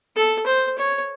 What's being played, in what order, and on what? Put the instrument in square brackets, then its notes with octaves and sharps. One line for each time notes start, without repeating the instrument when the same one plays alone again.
[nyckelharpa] A4
C5
C#5